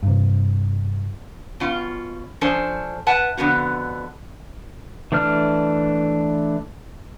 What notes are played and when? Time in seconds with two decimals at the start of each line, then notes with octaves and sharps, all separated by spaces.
0.03 G2 C3
1.60 B2 C#4 F4
2.41 F3 C#4 D4 A4 C5
3.07 B4 E5 F#5 A5
3.37 F2 D3 D#3 B3 F#4
5.12 E3 A3 D4 F6